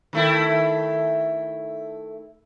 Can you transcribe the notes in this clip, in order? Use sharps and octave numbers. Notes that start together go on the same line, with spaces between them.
D#3 A3 E4